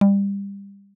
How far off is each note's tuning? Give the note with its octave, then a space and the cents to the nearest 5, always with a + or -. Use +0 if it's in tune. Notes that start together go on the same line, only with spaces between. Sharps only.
G3 +25